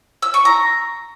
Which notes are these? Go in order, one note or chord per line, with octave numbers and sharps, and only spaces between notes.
E6
C#6
A#5